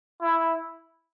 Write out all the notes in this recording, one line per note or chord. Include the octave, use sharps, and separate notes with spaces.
E4